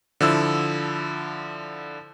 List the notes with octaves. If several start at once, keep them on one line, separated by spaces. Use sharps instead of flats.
D3 F3 E4 E6